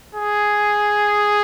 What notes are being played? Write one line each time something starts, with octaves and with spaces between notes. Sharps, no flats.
G#4